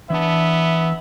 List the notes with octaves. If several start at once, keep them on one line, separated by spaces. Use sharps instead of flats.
E3 B3 D4 E5 A5